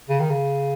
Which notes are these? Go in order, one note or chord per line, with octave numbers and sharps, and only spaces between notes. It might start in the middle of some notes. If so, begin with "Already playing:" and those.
C#3
D#3
C#3